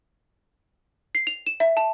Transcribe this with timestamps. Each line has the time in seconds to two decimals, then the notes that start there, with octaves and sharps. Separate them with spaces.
1.15 C7
1.27 F7
1.47 E7
1.60 E5
1.77 A5